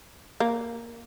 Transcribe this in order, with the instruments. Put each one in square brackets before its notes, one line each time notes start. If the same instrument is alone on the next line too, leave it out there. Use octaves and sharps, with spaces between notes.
[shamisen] A#3